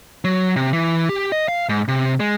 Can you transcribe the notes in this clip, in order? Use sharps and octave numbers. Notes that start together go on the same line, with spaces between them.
F#3
C3
E3
G4
D#5
F5
G#2
C3
G#3